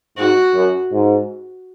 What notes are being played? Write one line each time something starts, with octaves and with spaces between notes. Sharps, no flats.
G#2 F#4
F#2
G#2